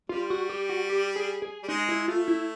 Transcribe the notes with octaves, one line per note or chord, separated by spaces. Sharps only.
G3 F4
F#4
G4
F#4
G4
G#4
G#4
G3
G#3 D#4
E4
A3 F4
E4